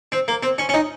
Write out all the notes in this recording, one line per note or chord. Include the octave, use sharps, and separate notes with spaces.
C4
A#3
C4
C#4
C#4
D#4